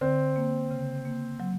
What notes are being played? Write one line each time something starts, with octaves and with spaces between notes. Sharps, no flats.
D3 C4
A#3
C#3
A#3
F#3